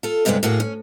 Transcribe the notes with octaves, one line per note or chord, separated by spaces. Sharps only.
F4 A4
D2 G2 C3 G#3 B3 D4
A2 A#3 F#4 G#4
C#4